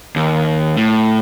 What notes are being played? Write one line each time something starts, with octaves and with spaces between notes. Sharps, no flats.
D#2
A2